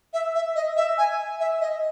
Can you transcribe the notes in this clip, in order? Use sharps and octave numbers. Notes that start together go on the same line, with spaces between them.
E5
E5
D#5
E5
G#5
E5
D#5